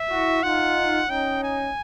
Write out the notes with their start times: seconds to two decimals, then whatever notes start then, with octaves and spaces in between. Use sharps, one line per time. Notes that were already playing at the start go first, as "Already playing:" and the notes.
Already playing: E5
0.10 E4 F#4
0.43 D#4 F4 F#5
1.10 C#4 D#4 G5
1.44 G#5